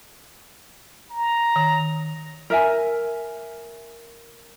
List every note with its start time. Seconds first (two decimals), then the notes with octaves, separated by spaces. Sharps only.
1.10 A#5
1.56 D#3
2.50 A#4 E5 G#5